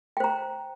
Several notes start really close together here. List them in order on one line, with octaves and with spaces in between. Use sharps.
G5 C5 A#5